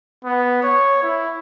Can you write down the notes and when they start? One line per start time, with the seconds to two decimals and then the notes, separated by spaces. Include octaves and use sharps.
0.25 B3
0.64 C#5
1.03 E4